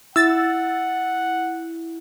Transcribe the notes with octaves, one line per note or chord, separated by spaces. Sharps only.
E4 F#5 E6 A6